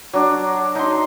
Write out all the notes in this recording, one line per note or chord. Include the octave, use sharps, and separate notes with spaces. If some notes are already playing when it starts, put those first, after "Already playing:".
F#3 D4
D#4 C6